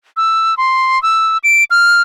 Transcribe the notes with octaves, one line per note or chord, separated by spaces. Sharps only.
E6
C6
E6
D7
F6